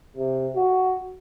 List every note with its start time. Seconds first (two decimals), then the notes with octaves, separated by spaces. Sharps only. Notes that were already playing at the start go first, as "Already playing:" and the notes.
0.17 C3
0.55 F#4